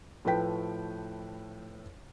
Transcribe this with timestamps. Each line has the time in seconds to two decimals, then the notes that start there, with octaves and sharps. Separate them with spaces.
0.25 A2 F3 A3 B4 G5 B6